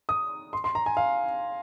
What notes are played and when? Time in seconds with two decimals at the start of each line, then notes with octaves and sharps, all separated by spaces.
0.09 D#6
0.53 C6
0.64 C6
0.75 A#5
0.86 G#5
0.97 F5